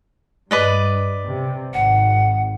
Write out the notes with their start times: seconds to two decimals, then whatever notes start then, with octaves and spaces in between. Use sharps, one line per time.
0.51 G2 B4 D5 D#5
1.25 C3
1.74 G#1 F#5